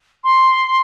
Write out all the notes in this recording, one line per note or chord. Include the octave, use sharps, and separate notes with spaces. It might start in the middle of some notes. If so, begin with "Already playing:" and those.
C6